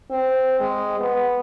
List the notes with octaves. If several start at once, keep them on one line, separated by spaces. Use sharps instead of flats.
C4
G#3
B3